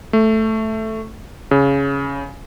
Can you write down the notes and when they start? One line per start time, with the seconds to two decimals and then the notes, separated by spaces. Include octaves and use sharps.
0.13 A3
1.51 C#3